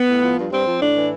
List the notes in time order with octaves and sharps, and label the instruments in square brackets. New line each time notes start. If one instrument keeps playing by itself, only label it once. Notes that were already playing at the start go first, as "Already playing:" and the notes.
Already playing: [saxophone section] B3
A2
F3
G2
G2 C4
F3
A2 D4
E3